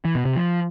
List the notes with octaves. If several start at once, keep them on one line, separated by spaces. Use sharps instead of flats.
E3
B2
C3
F3